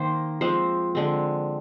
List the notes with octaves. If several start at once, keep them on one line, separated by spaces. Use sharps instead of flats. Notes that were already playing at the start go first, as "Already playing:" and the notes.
Already playing: D#3 A#3 C5
F3 G#3 C4 C5
D3 G#3 C4